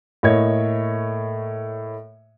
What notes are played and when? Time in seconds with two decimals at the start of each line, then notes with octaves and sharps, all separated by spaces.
0.23 A2 A#3 E4 C#5 D#5 G#6